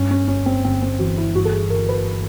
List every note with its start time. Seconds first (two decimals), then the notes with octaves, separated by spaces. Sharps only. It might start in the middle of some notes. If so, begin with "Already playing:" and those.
Already playing: G2 C#4
0.11 C#4
0.28 G1 C#4
0.46 C4
0.65 G1 C4
0.82 C4
0.99 E3 F#4
1.17 E4
1.35 G2 F#4
1.45 A4
1.52 G#4
1.70 G1 A#4
1.89 B4